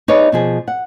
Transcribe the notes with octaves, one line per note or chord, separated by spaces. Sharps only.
D#4 G#4 A4 B4 C#5 D5
B2 F3 G#4
F#5